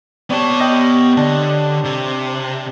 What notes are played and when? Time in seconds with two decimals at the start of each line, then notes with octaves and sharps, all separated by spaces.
0.30 B3 G4 C#5 D5 A5
0.60 D#5 G5
1.17 D3 D4
1.84 C3